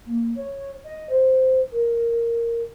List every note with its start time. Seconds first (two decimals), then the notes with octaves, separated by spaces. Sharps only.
0.05 A#3
0.35 C#5
0.84 D#5
1.09 C5
1.71 A#4